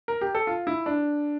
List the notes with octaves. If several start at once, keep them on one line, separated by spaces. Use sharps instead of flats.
A#4
G4
A4
F4
E4
D4